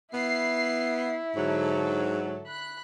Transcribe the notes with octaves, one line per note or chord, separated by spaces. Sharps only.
B3 E4 C7
G#2 D3 F#3 A4
B5 F#6